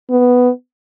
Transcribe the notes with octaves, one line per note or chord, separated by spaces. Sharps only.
B3